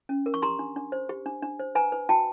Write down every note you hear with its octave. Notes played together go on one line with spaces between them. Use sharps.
C#4
A#4
C#6
G4 A#5 C6
D4
D4
C5
G4
D4
D4
C5
B4 G#5 A#5
B4
F#4 G5 A5